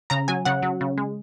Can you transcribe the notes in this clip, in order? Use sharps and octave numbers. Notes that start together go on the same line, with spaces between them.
C#3 A#5
F#3 G#5
C#3 F#5
F#3
C#3
G#3